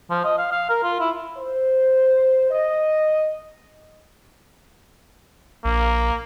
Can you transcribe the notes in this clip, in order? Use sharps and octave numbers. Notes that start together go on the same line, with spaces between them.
F3
D#5
F5
F5
A#4
F4
E4
C5
D#5
A#1 A#3